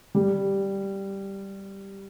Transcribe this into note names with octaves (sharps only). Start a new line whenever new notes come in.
G3